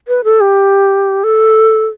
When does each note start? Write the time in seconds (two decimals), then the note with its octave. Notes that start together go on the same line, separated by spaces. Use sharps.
0.08 B4
0.24 A4
0.41 G4
1.24 A4